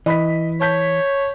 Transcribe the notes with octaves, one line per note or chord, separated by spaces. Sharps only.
E3 D#5 B5 B6
C#5 A5 G6 B6